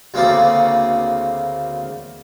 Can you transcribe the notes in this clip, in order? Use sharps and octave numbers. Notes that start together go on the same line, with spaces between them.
D2 C#3 A#3 C4 D5